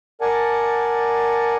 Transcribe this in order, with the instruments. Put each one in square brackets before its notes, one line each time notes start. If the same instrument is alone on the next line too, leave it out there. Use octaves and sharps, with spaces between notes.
[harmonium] A#4 D5 F#5 G#5 A5